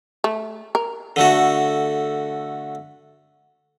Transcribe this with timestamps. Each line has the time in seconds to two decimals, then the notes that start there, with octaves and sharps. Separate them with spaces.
0.24 A3
0.75 A#4
1.16 D3 A3 F#4